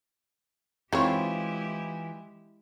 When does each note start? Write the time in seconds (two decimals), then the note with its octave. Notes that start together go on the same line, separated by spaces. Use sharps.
0.93 D#3 E3 G#3 C4 E4 F4 G4 C#5